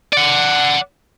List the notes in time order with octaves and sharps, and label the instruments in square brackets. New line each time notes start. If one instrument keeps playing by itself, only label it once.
[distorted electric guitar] D5 F#5